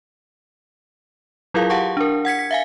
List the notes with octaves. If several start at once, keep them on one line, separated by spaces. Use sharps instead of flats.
F#3 E4 F4 G#4 A#4 F5
G4 F5 F#5 A5 C#6
D4 A#4
F#5 G#6 B6 C#7
B6
E5 F5 G#5